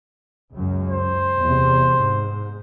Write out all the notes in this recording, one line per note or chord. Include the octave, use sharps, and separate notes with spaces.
C#2 F#2
C5
E2 C3
G#2